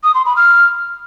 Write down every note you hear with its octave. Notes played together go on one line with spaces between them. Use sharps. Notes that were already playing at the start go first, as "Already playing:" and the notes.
D#6
C6
B5
F6